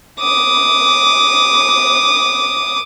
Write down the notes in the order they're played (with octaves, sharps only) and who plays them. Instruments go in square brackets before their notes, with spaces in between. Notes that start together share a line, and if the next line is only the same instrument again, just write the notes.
[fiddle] D6 D#6